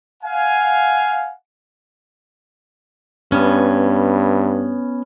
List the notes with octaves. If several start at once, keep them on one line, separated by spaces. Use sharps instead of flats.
F5 F#5 G#5
G2 B3 C#4